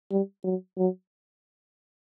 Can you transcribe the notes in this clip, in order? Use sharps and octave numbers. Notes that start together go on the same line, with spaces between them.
G3
F#3
F#3